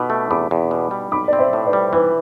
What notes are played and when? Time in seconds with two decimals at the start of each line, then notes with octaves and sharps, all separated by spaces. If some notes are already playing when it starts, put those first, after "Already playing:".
Already playing: B2 B5 D6
0.10 A3
0.30 E2 B5 D6
0.51 E2
0.71 B2
0.91 G3
1.12 B1 B5 D6
1.28 C4 D5
1.39 C5 E5
1.53 A2
1.66 B4 D5
1.73 G3
1.93 E3 B4